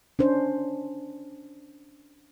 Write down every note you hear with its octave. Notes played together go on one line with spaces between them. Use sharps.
C#4 D4 C5